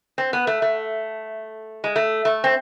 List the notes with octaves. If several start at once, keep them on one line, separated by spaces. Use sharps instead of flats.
C4
B3
A3
A3
G#3
A3
A3
C4